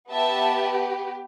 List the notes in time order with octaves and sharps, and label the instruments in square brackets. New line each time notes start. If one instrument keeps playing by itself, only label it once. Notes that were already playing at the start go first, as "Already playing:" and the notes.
[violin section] B3 G4 E5 A5